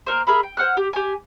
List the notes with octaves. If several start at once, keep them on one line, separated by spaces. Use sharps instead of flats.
A#3 D#4 A#4 C5
G#4 A#4 E5 B5
G5
C5 F#5 F6 F#6
G4
G4 G#5